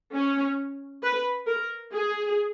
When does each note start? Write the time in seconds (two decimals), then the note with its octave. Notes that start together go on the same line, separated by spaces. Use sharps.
0.14 C#4
1.03 B4
1.47 A#4
1.93 G#4